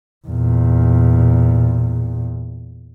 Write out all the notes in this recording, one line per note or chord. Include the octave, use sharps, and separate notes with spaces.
E2 A#2